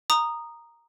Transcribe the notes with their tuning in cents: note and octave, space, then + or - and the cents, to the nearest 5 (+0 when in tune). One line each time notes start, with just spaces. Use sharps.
A#5 +0 D#6 -10